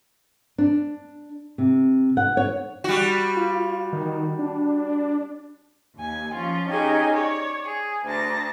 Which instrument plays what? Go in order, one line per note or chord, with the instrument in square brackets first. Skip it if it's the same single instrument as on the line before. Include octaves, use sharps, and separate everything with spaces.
[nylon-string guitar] D4
C3
F#5
C#5
[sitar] G3 F#4
[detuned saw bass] F4
D#3
D4
[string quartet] D#2 G#5
F3 C#4 F4
C#4 D#4 G4 G#4 G#5
C#5 D5
G#4
D2 A5 A#6